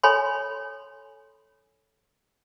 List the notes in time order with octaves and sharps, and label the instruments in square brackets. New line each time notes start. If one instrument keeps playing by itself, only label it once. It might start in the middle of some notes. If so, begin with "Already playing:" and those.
[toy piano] A4 C#5 G#5 B5 C6